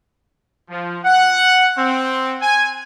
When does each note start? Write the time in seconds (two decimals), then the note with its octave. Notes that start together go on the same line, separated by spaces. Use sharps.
0.70 F3
1.04 F#5
1.77 C4
2.42 G#5